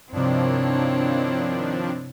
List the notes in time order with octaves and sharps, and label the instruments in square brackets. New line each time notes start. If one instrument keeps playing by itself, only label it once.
[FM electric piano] G2 C3 [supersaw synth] D#3 F3 D4 [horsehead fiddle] C4 [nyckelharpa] E4 C#5